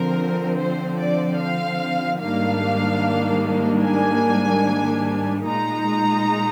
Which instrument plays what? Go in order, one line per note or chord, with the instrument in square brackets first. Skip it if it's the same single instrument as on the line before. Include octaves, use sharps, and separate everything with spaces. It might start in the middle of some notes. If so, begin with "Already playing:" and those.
Already playing: [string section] D3 F3 C4 A#4
C5
D5
F5
G#2 D#3 G3 A#3 D4 F5
G#5
A#2 G#3 D#4 A#5